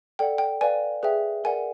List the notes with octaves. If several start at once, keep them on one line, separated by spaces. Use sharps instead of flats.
A4 D5 F#5 G5
G5
B4 D5 F5 G#5
G#4 B4 E5 G5
A#4 D5 F#5 G#5